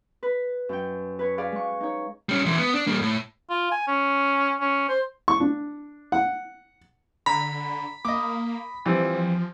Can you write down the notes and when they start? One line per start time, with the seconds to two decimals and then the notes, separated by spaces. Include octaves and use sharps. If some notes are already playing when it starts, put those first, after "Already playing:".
0.23 B4
0.69 F#2 G5
1.19 B4 C#5
1.38 G#4 B4 D5 F5
1.52 G#3 C#6
1.80 D#4 C#5
2.29 G3 C#4
2.46 E3 G#3
2.58 B3
2.75 D4
2.87 G3 A#3
3.01 A2
3.50 F4
3.71 G#5
3.87 C#4
4.60 C#4
4.89 C5
5.28 C#6
5.40 D4
6.12 F#5
7.26 D3 A#5 B5
8.05 A#3 D#5 D6
8.86 E3 F3 G3 C4